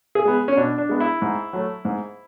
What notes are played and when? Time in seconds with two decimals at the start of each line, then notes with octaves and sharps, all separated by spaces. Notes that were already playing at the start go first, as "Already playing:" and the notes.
0.15 G#4
0.25 G#3 B3
0.48 C#4
0.57 B2 D4
0.78 D4
0.89 G#3 B3
1.00 E4
1.22 G#2
1.53 F#3 A3
1.85 G#2